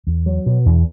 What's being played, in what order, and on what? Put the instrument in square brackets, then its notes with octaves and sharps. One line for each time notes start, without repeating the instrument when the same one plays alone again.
[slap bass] E2
F#3
B2
E2